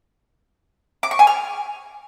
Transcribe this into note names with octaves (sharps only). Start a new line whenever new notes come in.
D6
C#6
G#5
F6